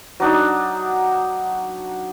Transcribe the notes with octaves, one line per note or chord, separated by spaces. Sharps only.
F#3 D4 D#4